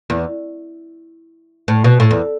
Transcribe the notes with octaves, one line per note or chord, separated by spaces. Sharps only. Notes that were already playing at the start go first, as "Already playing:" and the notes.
E2
A2
B2
A2
E2